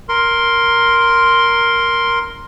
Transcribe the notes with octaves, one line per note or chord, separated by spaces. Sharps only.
A#4 C6